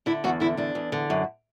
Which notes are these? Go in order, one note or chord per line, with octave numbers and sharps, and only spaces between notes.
D3 E4
E2 F#4
D3 E4
E2 D4
E2
D3
F#2